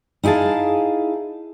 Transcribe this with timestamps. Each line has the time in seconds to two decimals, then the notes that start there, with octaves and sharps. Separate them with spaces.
0.23 D#4 E4 G#4 F5 A5